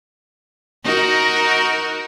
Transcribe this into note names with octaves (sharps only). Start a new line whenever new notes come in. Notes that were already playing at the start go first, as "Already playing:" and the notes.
D#4 F#4 A#4